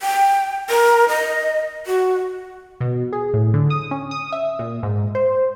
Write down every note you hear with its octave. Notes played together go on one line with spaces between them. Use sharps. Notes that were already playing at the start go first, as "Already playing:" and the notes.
G5
A#4
D#5
F#4
B2
G#4
A2
D3
D#6
C#4
D#6
E5
A#2
G#2
C5